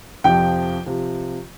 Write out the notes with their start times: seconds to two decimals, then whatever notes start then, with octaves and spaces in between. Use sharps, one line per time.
0.24 F2 C3 F3 G5
0.86 C3 F3